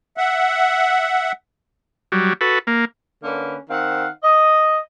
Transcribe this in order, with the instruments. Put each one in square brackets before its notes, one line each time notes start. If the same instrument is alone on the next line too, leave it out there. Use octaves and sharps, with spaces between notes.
[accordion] E5 F#5
[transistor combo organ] F#3 G3
F#4 A4 B4
A#3
[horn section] D3 A#3 C#4 B4
D#3 C4 F5 F#5
D#5